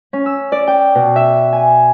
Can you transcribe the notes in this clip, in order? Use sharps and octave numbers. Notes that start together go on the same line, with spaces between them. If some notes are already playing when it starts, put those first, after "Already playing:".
C#4
E6
D5
G5
B2
E5
G#5